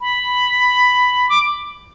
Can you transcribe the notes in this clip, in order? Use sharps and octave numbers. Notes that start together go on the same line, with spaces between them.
B5
D6